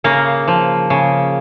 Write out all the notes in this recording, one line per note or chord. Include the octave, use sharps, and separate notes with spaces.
C#3 A#3
F3
C#3